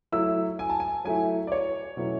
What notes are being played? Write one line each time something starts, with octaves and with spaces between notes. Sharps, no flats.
F#3 A3 E4 E6
G#5
A5
G#5
F#3 A3 E4 G#5
D5
C#5
B2 F#3 A3 C#4 E4